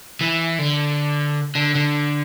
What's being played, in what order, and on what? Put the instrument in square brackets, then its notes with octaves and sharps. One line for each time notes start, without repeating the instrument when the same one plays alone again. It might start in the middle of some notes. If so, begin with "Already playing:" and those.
[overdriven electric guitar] E3
D3
D3
D3